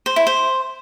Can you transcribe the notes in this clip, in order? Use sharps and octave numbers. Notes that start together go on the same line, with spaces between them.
C5
E4
C5